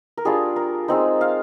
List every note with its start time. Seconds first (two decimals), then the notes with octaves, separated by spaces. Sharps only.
0.17 A#4
0.25 G3 D4 F4 G#4
0.56 A#4
0.88 G#3 C4 D#4 C5
1.21 F5